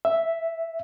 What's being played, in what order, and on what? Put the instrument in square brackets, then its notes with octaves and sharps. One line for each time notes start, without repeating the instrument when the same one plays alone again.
[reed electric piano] E5